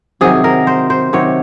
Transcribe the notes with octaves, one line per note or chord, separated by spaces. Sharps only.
C3 D#3 F#3 G#4
A#4
C5
C5
C3 D#3 F#3 C#5